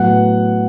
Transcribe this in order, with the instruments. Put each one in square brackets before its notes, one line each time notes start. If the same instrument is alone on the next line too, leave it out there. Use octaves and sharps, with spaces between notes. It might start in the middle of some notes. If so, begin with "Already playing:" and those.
Already playing: [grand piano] A2 F#3 B3 F#5